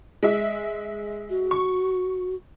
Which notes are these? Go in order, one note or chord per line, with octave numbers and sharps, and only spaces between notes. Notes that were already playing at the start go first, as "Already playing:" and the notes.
G#3 E5
F#4
C#6